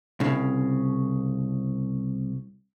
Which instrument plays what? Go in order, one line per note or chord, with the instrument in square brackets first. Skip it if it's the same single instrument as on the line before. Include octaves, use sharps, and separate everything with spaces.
[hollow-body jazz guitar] C2 C#3